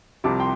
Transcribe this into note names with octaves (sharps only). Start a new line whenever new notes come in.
C2 C3 F3 A5 D6
G5 C6